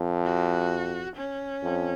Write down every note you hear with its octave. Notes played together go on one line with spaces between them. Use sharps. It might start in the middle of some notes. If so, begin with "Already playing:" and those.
Already playing: F2
F#4
C#4
F2